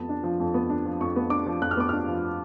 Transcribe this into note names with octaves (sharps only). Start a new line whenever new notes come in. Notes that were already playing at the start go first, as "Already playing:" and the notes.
Already playing: F2 B3 A5
D4
F3
F2
B3
D4
F3
F2 C#6
B3
D4 D6
F3
F2 F#6
F6
B3 D6
D4 F6
F3